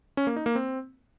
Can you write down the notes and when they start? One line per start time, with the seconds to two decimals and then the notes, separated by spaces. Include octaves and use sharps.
0.17 C#4
0.27 A#3
0.36 D#4
0.46 A#3
0.55 C4